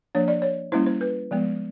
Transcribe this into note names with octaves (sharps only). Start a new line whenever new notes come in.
F3 A#3 D4 C#5
D5
C#5
G3 A#3 C#4 E4 C5
C5
B4
F3 G#3 B3